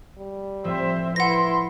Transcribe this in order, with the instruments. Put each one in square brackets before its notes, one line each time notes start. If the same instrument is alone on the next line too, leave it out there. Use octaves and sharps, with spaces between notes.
[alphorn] G3
[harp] A2 F3 [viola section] C4 C5 E5
[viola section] E4 C6 [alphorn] B4 [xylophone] F#5 A#6